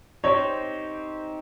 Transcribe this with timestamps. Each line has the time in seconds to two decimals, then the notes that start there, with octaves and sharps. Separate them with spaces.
0.24 C4 D#4 G4 C5 C#5